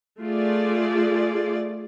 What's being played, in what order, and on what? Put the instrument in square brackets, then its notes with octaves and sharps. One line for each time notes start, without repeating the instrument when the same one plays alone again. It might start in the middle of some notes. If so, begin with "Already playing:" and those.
[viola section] A3 F4 G#4 D5